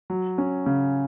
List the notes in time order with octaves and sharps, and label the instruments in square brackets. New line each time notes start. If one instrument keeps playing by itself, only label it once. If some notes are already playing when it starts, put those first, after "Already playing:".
[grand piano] F#3
C#4
C#3